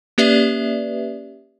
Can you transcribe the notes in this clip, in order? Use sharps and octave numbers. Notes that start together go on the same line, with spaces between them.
A#3 C#4 G4 B4 D5 E5